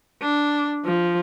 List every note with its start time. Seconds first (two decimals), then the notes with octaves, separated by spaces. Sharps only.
0.22 D4
0.85 F3